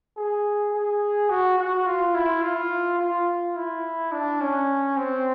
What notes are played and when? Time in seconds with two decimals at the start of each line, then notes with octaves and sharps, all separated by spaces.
0.16 G#4
0.73 G#4
1.30 F#4
1.58 F#4
1.86 F4
2.15 E4
2.42 F4
2.99 F4
3.56 E4
4.12 D4
4.41 C#4
4.96 C4